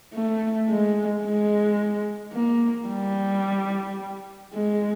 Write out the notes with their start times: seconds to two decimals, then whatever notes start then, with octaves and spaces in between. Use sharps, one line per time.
0.14 A3
0.69 G#3
1.24 G#3
2.33 A#3
2.88 G3
4.54 G#3